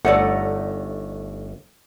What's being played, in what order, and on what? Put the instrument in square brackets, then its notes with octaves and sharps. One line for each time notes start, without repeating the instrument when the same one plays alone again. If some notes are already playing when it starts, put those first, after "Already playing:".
[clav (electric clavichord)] G1 [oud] A3 D#4 D5 [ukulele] A4 C#5 F#5